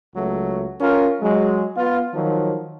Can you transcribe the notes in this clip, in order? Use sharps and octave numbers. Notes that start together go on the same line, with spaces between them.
C#2 F#3 A3
C#4 F4 A#4
F#3 G#3
B3 F4
D#3 F3 F#3